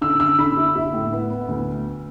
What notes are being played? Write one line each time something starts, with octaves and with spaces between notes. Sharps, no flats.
D3 E6
D3 E6
D3 B5
E4
E4
A2
B3
B3
D2